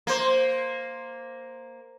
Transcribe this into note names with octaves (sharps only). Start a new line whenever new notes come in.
A#3 C5